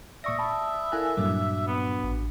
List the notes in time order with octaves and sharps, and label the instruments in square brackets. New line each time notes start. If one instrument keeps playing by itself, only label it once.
[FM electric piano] A#2 C#6 A#6 [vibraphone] D5 D#6 [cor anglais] E5
[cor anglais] E5 [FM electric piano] A5 B5
[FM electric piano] E4 G#5 F#6 [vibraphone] A4 A#4 F5
[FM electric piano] G2 A#2 F#3 [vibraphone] D4 F#4
[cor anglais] B3
[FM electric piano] A1